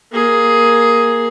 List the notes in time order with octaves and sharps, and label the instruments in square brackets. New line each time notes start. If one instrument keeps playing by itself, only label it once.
[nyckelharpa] A#3 G#4